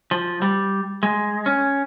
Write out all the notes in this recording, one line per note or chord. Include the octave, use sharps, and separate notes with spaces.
F3
G3
G#3
C#4